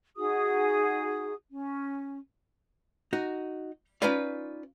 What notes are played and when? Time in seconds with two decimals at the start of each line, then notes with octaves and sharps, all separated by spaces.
0.17 D#4 F#4 G#4 D#6
1.51 C#4
3.13 D#4 F#4
4.02 C#4 D#4 F4 B4 D5 F5